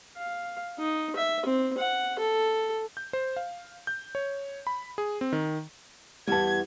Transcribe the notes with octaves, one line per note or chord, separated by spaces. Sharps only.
F5
D#4
E5
C4
F#5
A4
G6
C5
F5
G6
C#5
B5
G#4
C4
D#3
E2 G3 B3 A5 G#6